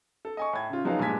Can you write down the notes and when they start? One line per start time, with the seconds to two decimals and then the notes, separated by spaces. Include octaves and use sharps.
0.25 A4
0.37 D#5 G#5 C#6
0.53 A2 G#6
0.70 C#3 F4
0.85 F3 F#3 B3 D#4 G#4 F5
0.99 A#1 G2 G#3 G#5 G#6 B6